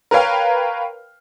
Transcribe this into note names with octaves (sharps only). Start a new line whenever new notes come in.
A#4 B4 C#5 F5 G5